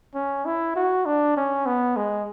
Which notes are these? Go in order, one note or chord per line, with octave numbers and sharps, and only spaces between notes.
C#4
E4
F#4
D4
C#4
B3
G#3